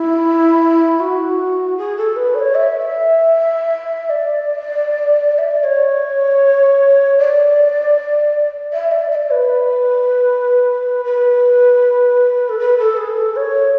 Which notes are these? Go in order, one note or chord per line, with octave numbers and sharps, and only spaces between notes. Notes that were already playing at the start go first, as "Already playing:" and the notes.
Already playing: E4
F#4
G#4
A4
B4
D5
C#5
E5
D5
E5
D5
C#5
D5
E5
D5
E5
D5
B4
B4
A4
B4
A4
G#4
A4
C#5